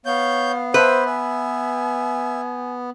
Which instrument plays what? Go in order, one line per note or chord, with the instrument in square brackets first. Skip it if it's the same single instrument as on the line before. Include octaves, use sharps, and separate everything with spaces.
[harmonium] B3 [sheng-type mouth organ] C#5 G6 [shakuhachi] F5
[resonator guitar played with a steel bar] B4 [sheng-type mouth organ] C5 E5
[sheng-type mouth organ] E5 [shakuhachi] G#5